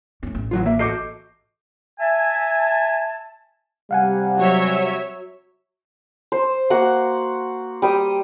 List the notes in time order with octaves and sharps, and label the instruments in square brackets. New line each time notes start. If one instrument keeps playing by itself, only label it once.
[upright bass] A3 C#4
A1
[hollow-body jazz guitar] E3 F#3 F4
[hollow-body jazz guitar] A#3 [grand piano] E5
[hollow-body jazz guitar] F#4 A4 D#5 [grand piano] D6 G6 C7
[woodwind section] E5 G#5 A5
[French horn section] C3 G3 [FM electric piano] F5 F#5 G#5
[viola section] F#3 C#5 E5
[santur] C5
A#3 F#4 F#5
G3 G5 D#6